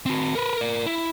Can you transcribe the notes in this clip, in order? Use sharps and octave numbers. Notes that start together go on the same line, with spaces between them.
C4 F#4
A#4 B4
A#4 D5
E4